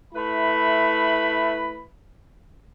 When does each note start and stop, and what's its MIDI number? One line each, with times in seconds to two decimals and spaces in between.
0.14 1.84 57
0.14 1.84 64
0.14 1.84 71
0.14 1.84 83